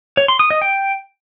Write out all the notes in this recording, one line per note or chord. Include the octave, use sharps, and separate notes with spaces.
C#5
C6
D#6
D#5
G5